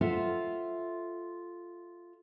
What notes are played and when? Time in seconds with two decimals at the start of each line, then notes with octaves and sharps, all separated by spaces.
0.01 F4 A4 C5 E5 F#5